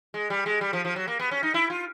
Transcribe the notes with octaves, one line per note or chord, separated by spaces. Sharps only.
G#3
G3
G#3
G3
F3
F3
F#3
A#3
B3
C#4
D#4
E4
F4